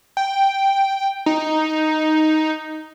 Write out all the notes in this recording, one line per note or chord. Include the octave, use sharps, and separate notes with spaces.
G5
D#4